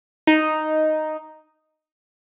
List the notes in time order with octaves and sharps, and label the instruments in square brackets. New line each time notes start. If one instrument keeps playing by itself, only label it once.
[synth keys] D#4